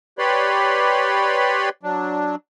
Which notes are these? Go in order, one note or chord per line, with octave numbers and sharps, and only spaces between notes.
G4 B4 C#5 D5 B5 C6
F#3 D4